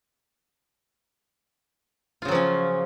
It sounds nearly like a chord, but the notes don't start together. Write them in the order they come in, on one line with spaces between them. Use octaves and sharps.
F4 C#3 F#3 F3 C#4